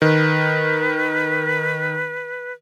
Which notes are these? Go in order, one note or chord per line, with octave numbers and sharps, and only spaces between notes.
D#3 B4